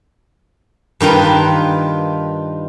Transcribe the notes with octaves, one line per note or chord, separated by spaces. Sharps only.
G2 D#3 F4 B4